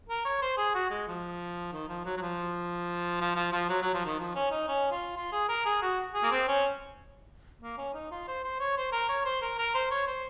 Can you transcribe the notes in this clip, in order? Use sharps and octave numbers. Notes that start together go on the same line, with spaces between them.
A#4
C#5
C5
G#4
F#4
G#3
F3
D#3
F3
F#3
F#3
F3
F3
F3
F3
F#3
F#3
F3
D#3
F3
C#4
D#4
C#4
F4
F4
G#4
A#4
G#4
F#4
G#4
A#3
C4
C#4
A#3
C#4
D#4
F4
C5
C5
C#5
C5
A#4
C#5
C5
A#4
A#4
C5
C#5
C5